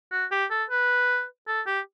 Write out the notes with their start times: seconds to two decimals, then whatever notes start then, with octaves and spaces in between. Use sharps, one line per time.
0.12 F#4
0.31 G4
0.50 A4
0.70 B4
1.47 A4
1.67 G4